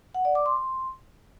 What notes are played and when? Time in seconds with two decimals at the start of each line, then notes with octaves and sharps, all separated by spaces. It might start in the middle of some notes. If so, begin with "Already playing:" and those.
0.14 F#5
0.25 D5
0.35 D6
0.46 C6
0.56 C6